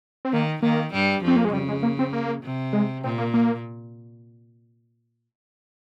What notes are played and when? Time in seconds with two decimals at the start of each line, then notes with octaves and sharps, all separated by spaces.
0.25 C4
0.32 D#3 A#3
0.62 D#3 A#3
0.93 G2 G3
1.23 F2 F3 C4
1.36 A#3
1.45 G#3
1.53 C#3 G3
1.68 G#3
1.83 A#3
1.99 C4
2.13 A#3
2.43 C3
2.73 G#3
3.04 A#2 C4
3.18 A#3
3.34 A#3